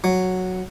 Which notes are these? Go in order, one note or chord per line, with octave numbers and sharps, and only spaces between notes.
F#3